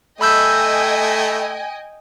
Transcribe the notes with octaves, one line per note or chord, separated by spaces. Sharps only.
A3 D#5 G5 G#5 B5 E6 G6